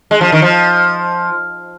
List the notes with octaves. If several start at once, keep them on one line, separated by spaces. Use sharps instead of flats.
G#3
F3
D#3
F3